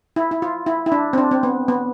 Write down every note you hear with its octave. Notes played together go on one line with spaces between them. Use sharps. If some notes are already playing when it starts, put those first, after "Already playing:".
E4
E4
F4
E4
E4
D4
C4
D4
C4
B3
B3